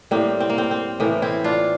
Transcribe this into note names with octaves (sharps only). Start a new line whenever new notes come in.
A2 G3 A#3 C4
C4
A#3
C4
C4
A2 E3 A#3
C4 E4
D4 F4